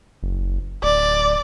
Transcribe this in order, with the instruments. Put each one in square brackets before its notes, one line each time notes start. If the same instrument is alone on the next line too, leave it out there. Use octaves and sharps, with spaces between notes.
[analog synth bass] F#1
[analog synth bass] D1 [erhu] D5